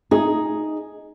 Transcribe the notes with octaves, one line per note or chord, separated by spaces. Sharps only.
D#4 G#4